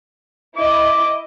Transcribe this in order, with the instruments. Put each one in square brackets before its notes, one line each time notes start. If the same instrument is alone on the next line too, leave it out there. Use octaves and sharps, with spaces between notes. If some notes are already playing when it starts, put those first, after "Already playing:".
[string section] E4 D#5 [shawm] D6